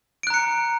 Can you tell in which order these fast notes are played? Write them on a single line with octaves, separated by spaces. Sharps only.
D7 F#6 A#5 C#7